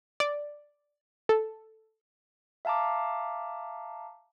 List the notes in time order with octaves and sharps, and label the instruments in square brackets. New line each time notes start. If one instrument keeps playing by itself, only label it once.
[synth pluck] D5
A4
[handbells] E5 F5 A5 A#5 D6